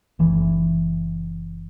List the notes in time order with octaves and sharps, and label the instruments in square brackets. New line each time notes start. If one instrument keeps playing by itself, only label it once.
[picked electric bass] F#1 E3